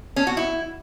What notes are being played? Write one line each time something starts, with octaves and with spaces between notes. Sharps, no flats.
C#4
F#4
E4